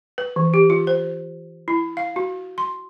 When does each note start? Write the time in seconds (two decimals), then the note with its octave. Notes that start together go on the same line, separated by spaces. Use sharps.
0.18 B4
0.36 E3
0.54 G4
0.70 F4
0.87 C5
1.68 E4
1.97 F5
2.16 F#4
2.58 C6